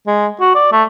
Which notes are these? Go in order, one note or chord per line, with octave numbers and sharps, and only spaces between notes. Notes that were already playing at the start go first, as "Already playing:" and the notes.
G#3
F#4
D5
A3